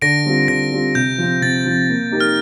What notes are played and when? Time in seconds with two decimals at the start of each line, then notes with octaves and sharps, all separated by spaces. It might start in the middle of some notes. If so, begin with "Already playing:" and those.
0.02 D3 A#6 D7
0.26 G3 C4 F4
0.48 D3 A#6
0.71 G3 C4 F4
0.95 C3 G6
1.18 F3 C4
1.41 C3 A6
1.66 F3 C4
1.89 A#3
2.12 D#4 G4 A#4
2.20 F6